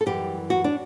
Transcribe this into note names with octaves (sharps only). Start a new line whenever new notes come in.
A4
F#2 E3 G3 G4
F#4
D4